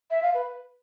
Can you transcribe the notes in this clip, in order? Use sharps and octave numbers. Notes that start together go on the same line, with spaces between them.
E5
F5
B4